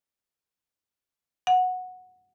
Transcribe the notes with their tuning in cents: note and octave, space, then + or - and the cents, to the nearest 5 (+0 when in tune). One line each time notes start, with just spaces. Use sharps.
F#5 -10